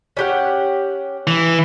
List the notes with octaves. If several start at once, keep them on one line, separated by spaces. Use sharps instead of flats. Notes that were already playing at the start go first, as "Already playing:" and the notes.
C#4 G4 F#5
E3